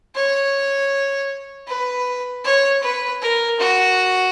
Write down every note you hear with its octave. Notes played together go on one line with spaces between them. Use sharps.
C#5
B4
C#5
B4
A#4
F#4